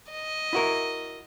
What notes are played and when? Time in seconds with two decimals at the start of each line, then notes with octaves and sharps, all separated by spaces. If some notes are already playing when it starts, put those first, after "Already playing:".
0.12 D#5
0.53 E4 F#4 A#4